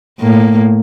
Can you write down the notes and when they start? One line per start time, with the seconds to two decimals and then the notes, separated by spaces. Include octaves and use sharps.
0.20 A2 A#3